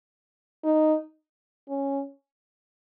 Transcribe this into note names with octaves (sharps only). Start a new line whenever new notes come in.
D#4
C#4